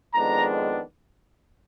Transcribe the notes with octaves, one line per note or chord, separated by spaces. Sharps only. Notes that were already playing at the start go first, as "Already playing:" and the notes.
F2 D#3 G#3 B3 D4 A#5